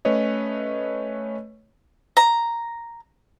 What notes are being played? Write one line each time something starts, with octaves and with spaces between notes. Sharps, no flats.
A3 C#4 B4 C#5 D#5
A#5